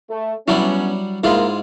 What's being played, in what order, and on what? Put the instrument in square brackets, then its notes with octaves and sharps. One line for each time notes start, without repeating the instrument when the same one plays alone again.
[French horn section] A3
[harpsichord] F#3 G3 D4 [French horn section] B3 C#4 [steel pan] E4
[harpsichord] G#2 G#3 F4 [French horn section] A#3 [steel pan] E4